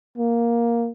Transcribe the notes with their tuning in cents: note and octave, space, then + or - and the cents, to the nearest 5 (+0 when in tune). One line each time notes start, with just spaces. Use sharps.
A#3 +5